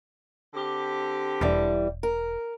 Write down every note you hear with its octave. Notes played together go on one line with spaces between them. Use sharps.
D3 C4 G4
E1 E3 G3
A#4